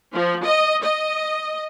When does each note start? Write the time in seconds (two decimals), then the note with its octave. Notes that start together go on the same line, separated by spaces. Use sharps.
0.13 F3
0.45 D#5
0.85 D#5